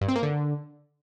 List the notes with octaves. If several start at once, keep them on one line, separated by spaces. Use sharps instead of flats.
G2
C4
A#3
D3